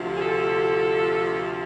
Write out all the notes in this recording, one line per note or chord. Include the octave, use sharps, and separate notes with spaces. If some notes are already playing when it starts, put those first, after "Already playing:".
Already playing: D2 C3 F3
G#4
A4